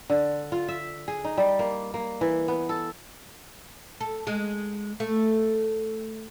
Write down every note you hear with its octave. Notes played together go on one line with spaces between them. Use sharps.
D3
F4
E5
G#4
D#4
G3
A#3
A#3
E3
B3
A4
A4
G#3
A3